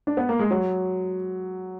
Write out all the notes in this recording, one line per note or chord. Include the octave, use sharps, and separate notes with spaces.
D4
B3
A#3
G#3
F#3